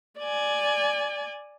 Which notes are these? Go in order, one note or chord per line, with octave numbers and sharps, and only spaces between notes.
D5 G#5